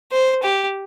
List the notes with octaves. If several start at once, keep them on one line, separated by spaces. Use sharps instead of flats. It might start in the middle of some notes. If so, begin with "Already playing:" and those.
C5
G4